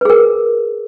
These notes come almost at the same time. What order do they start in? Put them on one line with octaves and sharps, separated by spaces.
B4 G#4 A#4